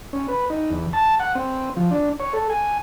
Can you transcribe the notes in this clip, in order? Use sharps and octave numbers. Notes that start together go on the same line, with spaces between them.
C#4
B4
D#4
E2
A5
F#5
C4
F3
D4
C#5
A4
G#5